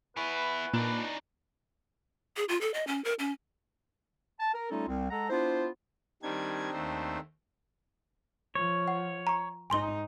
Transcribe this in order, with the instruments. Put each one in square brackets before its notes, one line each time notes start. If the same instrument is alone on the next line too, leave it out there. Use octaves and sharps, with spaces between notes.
[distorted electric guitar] B3 E4 [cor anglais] B4 [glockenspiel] G#5 B5 C#6
[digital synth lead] A#2 [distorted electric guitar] D4 D#4 [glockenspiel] A#5
[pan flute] G#4
F4
A4
D#5
C#4
A#4
C#4
[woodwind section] A5
A#4
G3 A3 C#4 D#4 F4 A4
C2 C4
G#3 A4 F#5 A#5
B3 D4 E4 F4 C5
[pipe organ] D#3 G3 G#6 [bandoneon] C4 D4 D#4
[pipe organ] D#2 A3 C5
[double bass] F3 [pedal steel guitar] C#5
[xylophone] F#5
A#5 C#6
[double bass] G#2 D#4 [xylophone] G#5 C6 G7